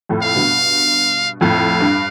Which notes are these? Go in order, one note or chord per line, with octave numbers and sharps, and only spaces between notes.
F2 A2
F5
G2 B2
F2 A2 F5
G2